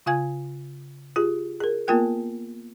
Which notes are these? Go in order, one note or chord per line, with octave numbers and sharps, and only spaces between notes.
C#3 F4 F5 G#5 G#6
F4 G4 G#4
G#4 A#4
A#3 B3 F4 A#4 G5 F#6